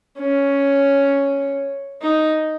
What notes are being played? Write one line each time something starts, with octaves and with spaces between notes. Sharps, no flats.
C#4
D#4